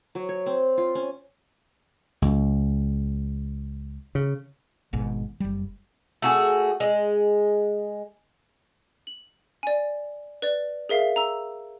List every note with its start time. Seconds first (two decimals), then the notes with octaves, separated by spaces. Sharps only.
0.15 F#3
0.29 C#5
0.46 C4
0.78 F4
0.95 C#4
2.22 C#2
4.15 C#3
4.93 G#1 G#2 B2
5.40 F#1 G3
6.22 A3 F#4 G#4
6.80 G#3
9.07 F#7
9.63 D5 G#5
10.42 B4 D5
10.89 G#4 A#4 E5 F5
11.16 A#5 E6